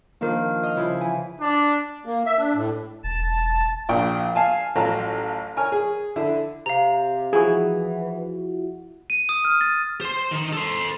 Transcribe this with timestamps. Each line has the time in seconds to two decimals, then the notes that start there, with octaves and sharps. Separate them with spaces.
0.21 D#3 F3 A#3 D4 A#4
0.63 D#5 F6
0.76 C#3 F3 E4
1.01 E3 G#5
1.40 D4
2.05 A#3
2.26 E5
2.38 D4
2.54 A2
3.04 E1 A5
3.89 A#1 A#2 G5 C#6
4.35 F5 G#5 A5
4.76 A1 F#3 F4 A5 A#5
5.57 A#4 C#5 G#5 F6
5.72 G#4
6.16 D3 E4
6.66 C3 F5 A#5
7.33 E3 F3 E4 F#4 G#4
9.10 D#7
9.29 D#6
9.45 F6
9.61 A6
10.01 C5 C6
10.31 D#3 D#4
10.53 A4 C5